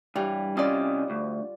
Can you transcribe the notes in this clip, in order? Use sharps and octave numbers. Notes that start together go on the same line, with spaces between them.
G2 E3 G3
C2 C#4 F4 D5 D#5
D2